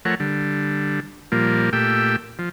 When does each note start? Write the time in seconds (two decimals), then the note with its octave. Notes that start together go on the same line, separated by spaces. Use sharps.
0.05 F3 A3 A#4 C#5 F#5
0.20 D3 G3
1.32 A#2 F3 G3 A#3
1.73 A#2 A3 G4 G5 E6
2.39 F3